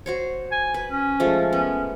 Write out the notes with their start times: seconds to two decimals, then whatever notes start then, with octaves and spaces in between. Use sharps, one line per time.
0.06 F#4 C5 C#5
0.52 G#5
0.74 B4
0.91 C#4
1.20 F3 G#3 A3
1.53 B3 C#4